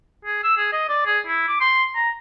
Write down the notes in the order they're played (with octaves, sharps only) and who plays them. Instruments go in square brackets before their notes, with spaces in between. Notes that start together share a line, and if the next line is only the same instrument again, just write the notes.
[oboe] G#4
E6
G#4
D#5
D5
G#4
E4
D6
C6
A#5